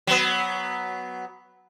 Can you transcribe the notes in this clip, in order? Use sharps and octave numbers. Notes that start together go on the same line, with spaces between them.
F#3 B3